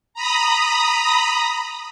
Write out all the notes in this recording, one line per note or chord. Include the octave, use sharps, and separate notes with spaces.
A#5 B5 D#6